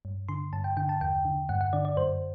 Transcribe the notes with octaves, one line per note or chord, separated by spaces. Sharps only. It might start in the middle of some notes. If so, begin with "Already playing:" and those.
G2
D3 C6
G2 A5
G5
D3 G5
A5
E2 G5
D3
G2 F#5
F#5
D3 D5
D5
F#2 C5